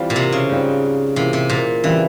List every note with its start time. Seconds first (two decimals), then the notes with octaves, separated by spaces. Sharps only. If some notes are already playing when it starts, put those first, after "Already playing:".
Already playing: E3 G3 C4 F4
0.10 A#2
0.16 C3
0.32 C#3
0.49 G#2 G3 C4 F4
1.16 C3 E3 A#3 F4
1.33 C3
1.50 A#2
1.84 C#3 E3 G3 C4 F4